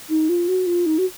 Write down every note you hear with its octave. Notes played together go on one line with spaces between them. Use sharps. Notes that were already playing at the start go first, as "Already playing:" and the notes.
D#4
F4
F#4
F4
D#4
F#4